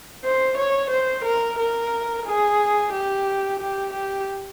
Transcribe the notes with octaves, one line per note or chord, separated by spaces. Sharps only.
C5
C#5
C5
A#4
A#4
G#4
G4
G4
G4